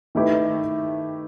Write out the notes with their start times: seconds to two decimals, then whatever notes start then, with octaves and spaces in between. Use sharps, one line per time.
0.15 D#3 A3 E4 G4 B4